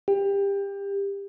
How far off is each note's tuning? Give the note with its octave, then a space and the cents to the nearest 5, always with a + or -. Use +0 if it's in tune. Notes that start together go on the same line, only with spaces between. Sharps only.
G4 +25